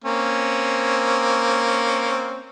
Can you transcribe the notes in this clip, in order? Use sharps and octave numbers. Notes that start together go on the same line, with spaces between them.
A#3 C4 C#4